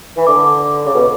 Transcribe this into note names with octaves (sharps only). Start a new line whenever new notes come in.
E3
D3 D6
D6
D6
C#3 D6
B2